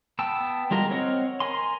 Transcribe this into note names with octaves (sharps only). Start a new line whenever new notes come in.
B3 G5 A5 E6
G3 G#3 F4 A#4
C4 C#5 D#5 F#5 F6
A#4 G#5 C6